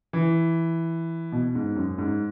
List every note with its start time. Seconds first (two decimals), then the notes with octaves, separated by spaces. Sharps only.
0.13 E3
1.32 B2
1.55 G#2
1.76 F#2
1.98 G#2